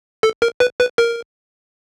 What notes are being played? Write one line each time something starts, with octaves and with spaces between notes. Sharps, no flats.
A4
A#4
B4
B4
A#4